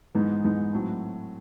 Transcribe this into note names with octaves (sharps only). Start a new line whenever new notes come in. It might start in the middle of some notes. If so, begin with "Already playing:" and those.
G#2 E3 G#3 B3 D#4
G#2 E3 G#3 B3 D#4
A2 F#3 A3 C4